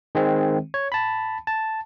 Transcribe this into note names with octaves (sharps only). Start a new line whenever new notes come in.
D#3 G#3 C4
C#5
A5 B5
A5